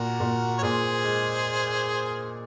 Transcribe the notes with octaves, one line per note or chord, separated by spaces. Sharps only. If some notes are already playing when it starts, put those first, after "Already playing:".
Already playing: A#2 F#4 A#4
A#2
C#5
A#2 G#4 C5
G#3